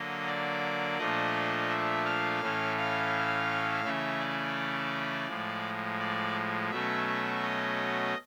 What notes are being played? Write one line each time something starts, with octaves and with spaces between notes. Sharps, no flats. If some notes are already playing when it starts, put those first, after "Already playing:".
Already playing: D3 F#3 A#3 D#5
D5
A#2 F3 A3 D4 D#5
E5
F5
A2 E3 A3 C#4
F5
C#3 E3 A3 C#4 E5
D5
A2 F3 G#3
D5
B2 F#3 A3 C#4 E5
E5
D#5